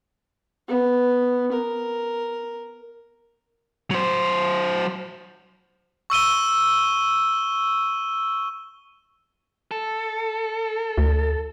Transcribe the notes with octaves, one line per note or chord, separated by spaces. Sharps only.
B3
A#4
F#3 C5
C#6 E6 D#7 G7
A4
D2